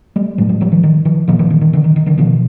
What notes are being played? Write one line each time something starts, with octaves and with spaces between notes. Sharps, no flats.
G3 A3
A2 F#3 G#3
F#3 G#3
F3 G3
D#3 F3
D#3
D#3 F3
A#2 D#3 F3
D#3 F3
D#3
D#3
D3 E3
D#3
D#3
D3 E3
B2 D#3 F3